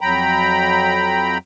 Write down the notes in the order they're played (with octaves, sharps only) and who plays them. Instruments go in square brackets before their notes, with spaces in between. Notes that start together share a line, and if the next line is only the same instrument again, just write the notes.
[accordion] F2 F#3 G5 A#5 B5